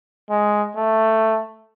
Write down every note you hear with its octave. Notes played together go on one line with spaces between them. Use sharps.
G#3
A3